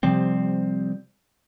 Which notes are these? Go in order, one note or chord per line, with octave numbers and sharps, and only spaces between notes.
C3 F3 G3 C4